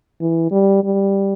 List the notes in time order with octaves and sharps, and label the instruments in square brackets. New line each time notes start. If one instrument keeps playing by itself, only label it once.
[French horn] E3
G3
G3